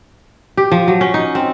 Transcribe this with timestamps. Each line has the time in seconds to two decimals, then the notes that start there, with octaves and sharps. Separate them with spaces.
0.57 G4
0.72 F3
0.88 F#3
1.01 C#4
1.14 D#4
1.35 C4